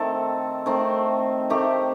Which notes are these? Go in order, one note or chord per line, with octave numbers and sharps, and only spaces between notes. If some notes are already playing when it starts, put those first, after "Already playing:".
Already playing: D#3 A3 C4 A4
D#3 A3 C4
D#3 A3 C4 G4